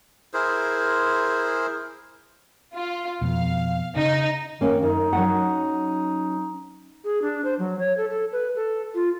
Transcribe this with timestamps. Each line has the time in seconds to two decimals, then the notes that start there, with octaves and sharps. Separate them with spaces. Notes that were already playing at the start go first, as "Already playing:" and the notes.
0.34 E4 G#4 A#4 C5
2.74 F4
3.21 F2 B2 F5
3.96 C#3 D#4
4.61 D#3 A#3 C#4
4.82 F#2 D#4
5.13 F#3 C#4 F#5
7.04 G#4
7.22 D4
7.44 C5
7.59 F#3
7.79 C#5
7.97 A4
8.10 A4
8.32 B4
8.56 A4
8.94 F4